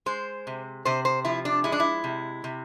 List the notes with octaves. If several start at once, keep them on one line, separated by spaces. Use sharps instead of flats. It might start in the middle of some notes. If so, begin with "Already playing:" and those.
G#3 C5
C3
C3 C5
C5
F3 E4
D4
G#3 E4
D4
E4
C3
C3